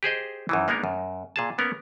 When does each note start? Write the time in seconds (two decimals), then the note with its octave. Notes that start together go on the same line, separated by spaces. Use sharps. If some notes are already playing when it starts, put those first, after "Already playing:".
0.03 G4 G#4 C5 D#5
0.49 F#2 D#3 E3
0.68 G#3 A#3 B3 D4 D#4 A#4
0.84 F#2
1.36 A#2 G#4 A5
1.58 A#3 B3 C#4 A#4